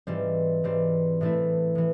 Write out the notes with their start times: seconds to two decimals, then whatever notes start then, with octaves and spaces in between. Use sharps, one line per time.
0.07 G#2 E3 G3 C4
0.64 G#2 E3 G3 C4
1.21 A2 E3 A3 C4 E4
1.75 A2 E3